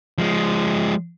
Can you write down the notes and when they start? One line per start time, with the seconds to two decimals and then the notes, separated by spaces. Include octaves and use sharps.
0.18 F3 G#3